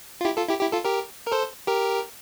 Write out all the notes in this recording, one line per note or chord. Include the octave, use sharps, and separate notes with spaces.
F4
E4 G4
F4 A4
E4 G4
E4 G4
F4 A4
G4 A#4
A#4
A4 C5
G4 A#4